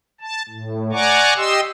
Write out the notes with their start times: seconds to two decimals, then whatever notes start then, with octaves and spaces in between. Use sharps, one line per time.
0.21 A5
0.49 A2
0.92 D5 F#5 G#5 A#5 C#6 D6
1.37 G4 D#5 C6 E6